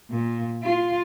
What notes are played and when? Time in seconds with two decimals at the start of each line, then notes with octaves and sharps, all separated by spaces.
0.11 A#2
0.63 F4